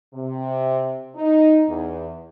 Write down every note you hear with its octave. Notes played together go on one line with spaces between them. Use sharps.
C3
D#4
E2